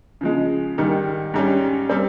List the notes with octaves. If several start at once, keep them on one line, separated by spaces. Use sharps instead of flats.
C#3 F3 G#3
G#2 D#3 G3
G#2 G3 C#4
G3 C4